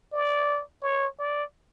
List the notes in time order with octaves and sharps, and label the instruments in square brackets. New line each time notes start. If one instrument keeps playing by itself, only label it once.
[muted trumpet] D5
C#5
D5